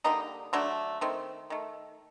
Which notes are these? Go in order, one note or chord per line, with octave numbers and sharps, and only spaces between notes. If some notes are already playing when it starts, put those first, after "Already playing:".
D3 G3 A#3 D#4
D3 F#3 A3 D4
D#3 A3 C4
D#3 A3